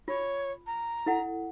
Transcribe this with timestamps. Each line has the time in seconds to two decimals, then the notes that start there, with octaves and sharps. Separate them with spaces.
0.08 F4 C#5
0.66 A#5
1.06 E4 A4 F#5